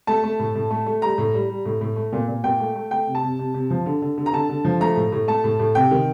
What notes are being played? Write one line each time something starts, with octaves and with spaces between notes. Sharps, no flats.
A3 A5
A3
A2
A2
A3
A3
G3 A#5
A2
G3
G3
A2
A2
A3
A#2
A#2
A#2 G5
A3
A3
A3 G5
C3
A5
C3
C3
C3
F3
D3
D3
D3
A#5
D3 A5
D3
F3
A3 A#5
A2
A2
A3 A5
A2
A2
C3 G5
D#3